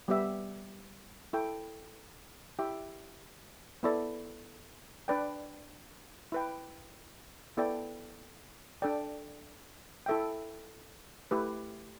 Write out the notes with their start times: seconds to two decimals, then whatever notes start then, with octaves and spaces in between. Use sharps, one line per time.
0.08 G3 B3 G4 E5
1.33 E4 A4 G5
2.59 E4 G4 E5 G5
3.83 B3 E4 A4 D5
5.08 D4 B4 D5 G5
6.32 E4 B4 G5
7.57 B3 E4 A4 D5 G5
8.82 D4 A4 D5 G5
10.06 E4 A4 E5 G5
11.31 A3 E4 G4 B4